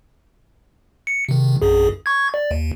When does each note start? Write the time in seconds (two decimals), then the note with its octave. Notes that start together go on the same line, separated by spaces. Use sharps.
1.07 C#7
1.29 C3 D#3
1.62 A#1 F#2 G#4
2.06 C#6 G#6
2.34 D5
2.51 D#2